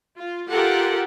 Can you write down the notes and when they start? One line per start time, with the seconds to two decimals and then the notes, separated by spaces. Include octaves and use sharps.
0.18 F4
0.49 F4 G4 A4 A#4 F#5